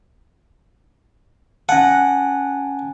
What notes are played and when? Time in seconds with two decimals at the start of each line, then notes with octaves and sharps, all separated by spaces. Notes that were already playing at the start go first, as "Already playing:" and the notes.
1.69 C#4 F#5 G#5 A5